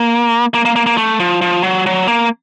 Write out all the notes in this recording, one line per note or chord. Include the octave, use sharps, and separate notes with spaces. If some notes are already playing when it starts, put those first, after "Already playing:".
Already playing: A#3
A#3
A#3
A#3
A#3
A3
F3
F3
F#3
F#3
A#3